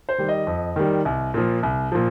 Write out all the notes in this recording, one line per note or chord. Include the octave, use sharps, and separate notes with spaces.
C5
D#3 G3
D#5
F2
D#3 G3
C2
A#2 F3
C2
A#2 F3